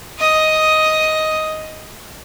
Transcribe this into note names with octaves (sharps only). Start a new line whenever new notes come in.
D#5 D#6